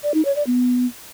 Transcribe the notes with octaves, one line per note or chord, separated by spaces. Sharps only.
D5
D#4
C#5
D5
B3